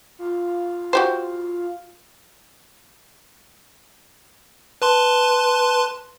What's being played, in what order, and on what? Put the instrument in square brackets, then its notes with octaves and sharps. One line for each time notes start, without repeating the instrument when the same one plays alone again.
[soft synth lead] F4
[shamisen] F#4 G4 C5
[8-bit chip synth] B4 A5 C6